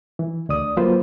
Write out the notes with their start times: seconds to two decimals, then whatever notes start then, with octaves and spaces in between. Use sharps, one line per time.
0.19 E3
0.49 D2 D5 D#6
0.77 F#3 A#3 F4 B4 C5